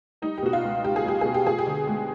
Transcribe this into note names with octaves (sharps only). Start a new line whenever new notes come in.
G3 D#4
G4
B2 F#4
F4
C#2
C#2 G4
G#4
G3 G4
B2 G#4
G4
F3 G#4
G4
D3
G#3